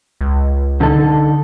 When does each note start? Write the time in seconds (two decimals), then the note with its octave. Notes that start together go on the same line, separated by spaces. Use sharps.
0.21 C#2
0.81 D3 D#4 A4